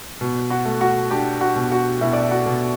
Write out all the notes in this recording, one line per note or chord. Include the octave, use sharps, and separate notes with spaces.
B2
F#4 F#5
A3
F#4 F#5
D4 G4 G5
F#4 F#5
B2
F#4 F#5
B2 E4 E5
D5
E5
F#4 F#5
B2